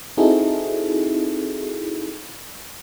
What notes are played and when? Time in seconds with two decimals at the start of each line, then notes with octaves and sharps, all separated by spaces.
0.17 C4 D#4 E4 F#4 G#4 A4